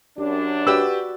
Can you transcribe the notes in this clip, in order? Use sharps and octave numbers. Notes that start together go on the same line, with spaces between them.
F#2 D4 G4
F#4 G4 B4 D5 E6